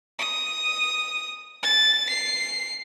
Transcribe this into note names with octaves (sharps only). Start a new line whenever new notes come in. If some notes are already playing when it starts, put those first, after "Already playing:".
D#6
A6
C7